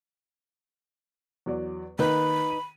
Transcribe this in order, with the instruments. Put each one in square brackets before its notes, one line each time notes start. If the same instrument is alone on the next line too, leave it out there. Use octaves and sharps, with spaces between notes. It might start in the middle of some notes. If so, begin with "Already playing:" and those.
[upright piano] E2 F#3 D5
[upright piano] D#3 A#3 [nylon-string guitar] D#4 B4 [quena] B5
[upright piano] D#7